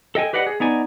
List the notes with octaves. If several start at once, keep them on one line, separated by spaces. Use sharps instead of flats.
A4 D#5 G5 G#5
G4 B4 D5 D#5 F#5
G#4
B3 D#4 D5 G#5